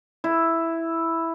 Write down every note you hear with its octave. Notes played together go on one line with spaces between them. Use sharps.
E4